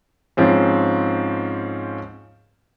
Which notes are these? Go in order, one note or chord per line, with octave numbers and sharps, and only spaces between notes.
G#2 F3 C4 C#4